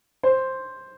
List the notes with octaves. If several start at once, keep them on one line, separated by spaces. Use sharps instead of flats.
C5